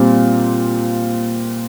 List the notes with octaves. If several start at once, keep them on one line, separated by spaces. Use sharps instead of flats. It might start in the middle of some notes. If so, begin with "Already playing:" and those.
Already playing: A#2 G3 C4